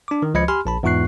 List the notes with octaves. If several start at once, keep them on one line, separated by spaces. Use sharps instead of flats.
D4 D6
D#3
C#2 F3 D#5 B5 G#6 C#7
G4 G#5 B5 C6 F6
A#1 A5 B5
E2 G#2 F4 C#6 F#6 C7